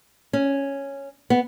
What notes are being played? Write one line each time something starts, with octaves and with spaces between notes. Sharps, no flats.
C#4
B3